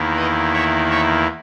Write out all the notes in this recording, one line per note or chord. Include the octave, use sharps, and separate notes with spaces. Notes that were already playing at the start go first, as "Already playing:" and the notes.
Already playing: E2 D#3 A#3 E4
B4 D#5
C#5 E5
C#5 E5